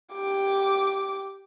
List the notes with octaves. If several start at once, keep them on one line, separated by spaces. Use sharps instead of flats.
G4 D6